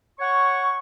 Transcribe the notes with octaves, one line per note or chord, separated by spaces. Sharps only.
C#5 F#5 C#6